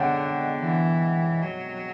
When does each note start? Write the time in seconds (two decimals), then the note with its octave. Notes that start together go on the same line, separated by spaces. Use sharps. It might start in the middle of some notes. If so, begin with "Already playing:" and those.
Already playing: D3 C#5 F#5 G5
0.60 E3
1.43 F#3